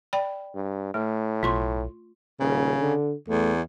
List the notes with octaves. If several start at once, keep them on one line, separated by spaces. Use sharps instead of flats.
D5 G5 B5
G2
A2 A3
B1 F4 C6 C#6
D#1 C#3
D3
E2 A3